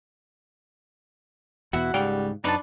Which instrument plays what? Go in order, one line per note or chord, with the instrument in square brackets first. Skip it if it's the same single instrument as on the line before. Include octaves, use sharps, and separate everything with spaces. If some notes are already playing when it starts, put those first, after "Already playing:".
[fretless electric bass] E2 B2 [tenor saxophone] E4 [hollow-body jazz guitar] F#4 [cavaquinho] F#5
[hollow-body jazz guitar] C#2 F5 G5 [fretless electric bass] G#2 [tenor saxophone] G3
[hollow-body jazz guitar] F#2 D#4 [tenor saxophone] D4 [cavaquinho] B4 A5